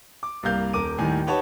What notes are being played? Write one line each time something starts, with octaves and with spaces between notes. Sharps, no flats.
D6
C2 G2 A#3 F5 G6
D#1 A#4 D6 D#7
D#2 A2 D#3 G3 G#5
D#4 G4 B4 C#5 F#5 A5